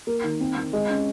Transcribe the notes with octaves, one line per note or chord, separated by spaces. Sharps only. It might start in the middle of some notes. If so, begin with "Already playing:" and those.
A#3
D#3
C4
C4
G#3
C#4